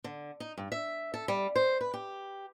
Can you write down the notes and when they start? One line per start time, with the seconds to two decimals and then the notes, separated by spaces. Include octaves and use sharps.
0.04 D3
0.40 D#4
0.58 G2
0.72 E5
1.14 A4
1.28 G3
1.56 C5
1.81 B4
1.94 G4